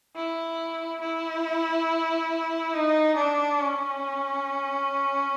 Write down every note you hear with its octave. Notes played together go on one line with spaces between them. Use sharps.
E4
E4
D#4
D4
C#4